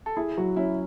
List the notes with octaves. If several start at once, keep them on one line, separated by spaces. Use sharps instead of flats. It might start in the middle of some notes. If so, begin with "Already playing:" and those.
A4
E4 G#4
F#3 F#4
C#4 E4